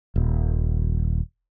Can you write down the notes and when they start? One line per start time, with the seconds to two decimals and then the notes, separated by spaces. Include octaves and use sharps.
0.16 D#1